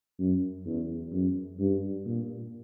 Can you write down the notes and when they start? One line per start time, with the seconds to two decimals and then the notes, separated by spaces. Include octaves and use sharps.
0.19 F#2
0.66 E2
1.12 F#2
1.59 G2
2.05 A#2